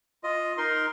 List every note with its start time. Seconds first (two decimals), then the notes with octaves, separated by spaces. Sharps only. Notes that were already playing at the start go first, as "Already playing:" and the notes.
0.24 F4 D#5
0.58 D#4 A#4 C6